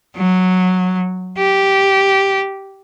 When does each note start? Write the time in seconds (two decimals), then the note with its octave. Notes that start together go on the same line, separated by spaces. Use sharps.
0.17 F#3
1.39 G4